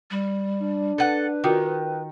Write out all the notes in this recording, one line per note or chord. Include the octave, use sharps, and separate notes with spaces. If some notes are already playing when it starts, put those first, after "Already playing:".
G3
D4
A4 B4 F#5
D#3 F4 F#4 A#4